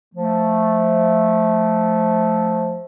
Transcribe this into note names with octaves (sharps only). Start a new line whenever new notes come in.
F3 A3